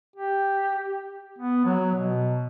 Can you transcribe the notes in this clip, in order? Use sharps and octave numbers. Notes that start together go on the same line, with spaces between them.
G4
B3
F#3
B2